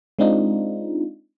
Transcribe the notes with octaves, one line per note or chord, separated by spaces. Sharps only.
G#3 C4 D4 D#4 F4